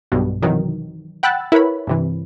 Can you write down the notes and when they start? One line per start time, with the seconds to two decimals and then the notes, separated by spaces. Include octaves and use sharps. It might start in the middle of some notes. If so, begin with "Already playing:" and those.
0.12 B1 G2 B2
0.42 C3 D#3 E3 F#3
1.23 F#5 G5 B5 E6 F#6 A6
1.52 E4 A#4 B4 C#5 B5
1.87 G2 C3 E3